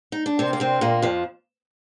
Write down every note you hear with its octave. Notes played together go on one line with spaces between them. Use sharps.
D#4
D4
C3 C4 A#4 D5 G5 C6
A#3
C3 C4
A#2 A#3
F2 F3